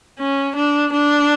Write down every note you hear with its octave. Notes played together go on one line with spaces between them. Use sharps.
C#4
D4
D4